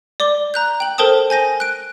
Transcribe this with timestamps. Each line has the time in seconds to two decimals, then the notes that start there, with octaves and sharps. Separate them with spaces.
0.20 D5 D6 G7
0.54 A#5 F#6 G6
0.80 G5 F#7
0.98 A4 A#4 C5 G5 A5 D#6
1.30 G#5 G6 A#6 D#7
1.60 F#6 D7